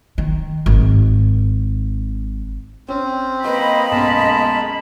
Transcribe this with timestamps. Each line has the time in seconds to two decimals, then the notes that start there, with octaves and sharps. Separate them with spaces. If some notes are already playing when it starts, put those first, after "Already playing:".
0.18 D#3
0.66 G#1
2.88 C4 C#4
3.44 A#3 B4 D#5 G5 B5 C6
3.91 B1 F#2 G#3 A5